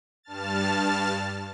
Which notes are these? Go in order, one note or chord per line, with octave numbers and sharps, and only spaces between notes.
G2 A5 F6 A6